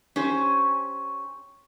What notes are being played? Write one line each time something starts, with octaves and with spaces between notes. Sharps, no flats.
C#4 G4 C5